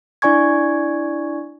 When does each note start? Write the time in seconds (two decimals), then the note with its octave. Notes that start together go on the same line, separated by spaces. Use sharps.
0.22 D4 E4 D5 G#5 C#6 G#6